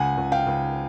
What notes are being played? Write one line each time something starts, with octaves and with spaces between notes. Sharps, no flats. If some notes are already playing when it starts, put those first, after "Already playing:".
Already playing: C#2 F#5 G#5
C#2
F5 G5
C#2